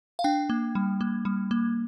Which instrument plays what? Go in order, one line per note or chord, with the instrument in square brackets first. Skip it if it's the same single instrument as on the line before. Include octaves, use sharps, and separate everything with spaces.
[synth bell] F5
D4 G5
A#3
G3
A#3
G3
A#3